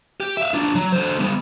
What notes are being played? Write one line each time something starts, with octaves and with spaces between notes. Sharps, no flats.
G4
E5 F5
D4 F4
F#3
D3 C5
G3 B3